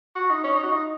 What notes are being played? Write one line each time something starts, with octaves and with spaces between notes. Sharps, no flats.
F#4
D#4
C#4
D#4
F#4
D#4